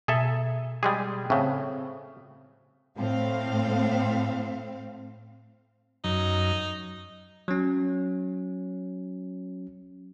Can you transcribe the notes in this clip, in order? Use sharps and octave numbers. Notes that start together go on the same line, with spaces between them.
B2 G#4 A4 E5
G3 G#3 G#4
A2 C#3 C4
A2 A3 C4 F5
F#2 D#4
F#3 C#4